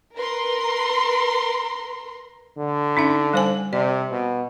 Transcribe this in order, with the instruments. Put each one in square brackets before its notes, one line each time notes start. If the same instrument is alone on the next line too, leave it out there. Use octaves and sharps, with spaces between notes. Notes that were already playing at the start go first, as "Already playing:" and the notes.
[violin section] A#4 B4 A#5 C6
[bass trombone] D3
[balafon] C#4 D#4 E5
G3 C5 G#5
[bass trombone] C3 [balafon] D5
[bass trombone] B2